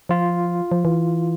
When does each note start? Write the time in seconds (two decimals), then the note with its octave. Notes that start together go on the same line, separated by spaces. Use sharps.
0.09 F3 F4
0.72 F3
0.85 E3